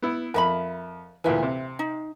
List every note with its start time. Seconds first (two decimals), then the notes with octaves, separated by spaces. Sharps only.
0.02 B3 E4
0.34 F2 A#4 E5 B5
1.24 D2 A#2 E3 B4 E5
1.43 C3
1.79 D#4